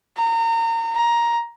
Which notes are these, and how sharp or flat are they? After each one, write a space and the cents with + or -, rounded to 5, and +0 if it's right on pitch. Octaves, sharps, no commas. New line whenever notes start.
A#5 -30
A#5 +10